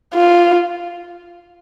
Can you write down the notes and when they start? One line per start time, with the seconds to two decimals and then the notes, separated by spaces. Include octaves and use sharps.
0.14 F4